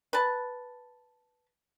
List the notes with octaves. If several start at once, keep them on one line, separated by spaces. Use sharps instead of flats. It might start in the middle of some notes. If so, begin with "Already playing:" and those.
B4 A5